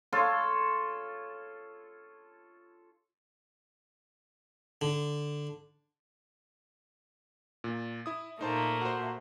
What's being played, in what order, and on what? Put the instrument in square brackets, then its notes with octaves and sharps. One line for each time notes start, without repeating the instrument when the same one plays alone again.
[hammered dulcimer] F4 A4 C#5
[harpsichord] D3
[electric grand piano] A#2
E4 D#6
[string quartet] A#2 A3 A#3 [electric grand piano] D#4 C5 A5
[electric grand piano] F#4 C5